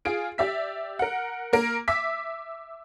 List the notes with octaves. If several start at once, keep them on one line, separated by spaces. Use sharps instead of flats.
F4 G#4 D7
G4 D5 E5 B6
A#4 F#5
A#3 A#4
E5 D6 E6 B6